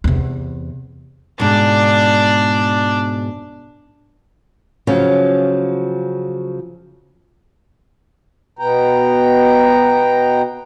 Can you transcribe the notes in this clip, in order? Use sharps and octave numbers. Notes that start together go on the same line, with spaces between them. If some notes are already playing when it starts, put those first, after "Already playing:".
E2 C3
G#2 B2 D4 D5
C#3 F3 F#3 C#4
B2 B3 G5 A#5